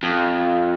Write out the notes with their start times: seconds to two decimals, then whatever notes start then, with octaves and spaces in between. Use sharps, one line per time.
0.03 F2